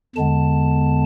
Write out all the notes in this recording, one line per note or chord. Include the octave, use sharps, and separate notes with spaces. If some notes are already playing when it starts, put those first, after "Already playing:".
E2 D3 G#3 B3 A5